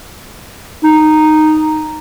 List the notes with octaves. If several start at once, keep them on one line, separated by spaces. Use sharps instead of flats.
D#4